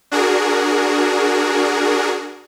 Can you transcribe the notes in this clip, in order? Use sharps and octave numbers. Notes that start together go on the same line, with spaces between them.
D4 F#4 G#4 A#4